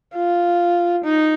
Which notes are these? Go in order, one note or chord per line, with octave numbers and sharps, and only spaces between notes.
F4
D#4